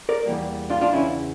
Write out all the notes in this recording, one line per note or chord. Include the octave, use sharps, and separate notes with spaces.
A#4 D5
E2 E3 G3 A#3
D4 F4
D4 F4
E2 C#3 E3 C#4 E4